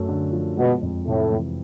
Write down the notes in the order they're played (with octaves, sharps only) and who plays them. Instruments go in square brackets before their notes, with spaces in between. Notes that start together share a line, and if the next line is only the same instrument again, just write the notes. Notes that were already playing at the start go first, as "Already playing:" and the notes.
Already playing: [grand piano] F#2 A3
D3
F3
[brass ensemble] B2 [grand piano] G#3
[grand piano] F2
[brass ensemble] A2 [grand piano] C3
[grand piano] E3